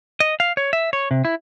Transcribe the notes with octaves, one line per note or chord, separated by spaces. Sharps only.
D#5
F5
C#5
E5
C#5
C3
E4